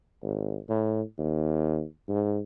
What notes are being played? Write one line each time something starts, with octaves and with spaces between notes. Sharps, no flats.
G#1
A2
D#2
G#2